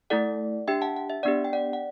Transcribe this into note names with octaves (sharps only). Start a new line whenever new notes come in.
A3 E4 A4 D5 F#5
D4 G4 E5 G5
F#5 A5
F#5
E5
B3 D4 G4 D5 F#5
G5
D5 F#5
F#5